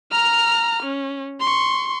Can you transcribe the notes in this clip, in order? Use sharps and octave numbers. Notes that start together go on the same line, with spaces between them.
A#5 F6
C#4
C6 C#6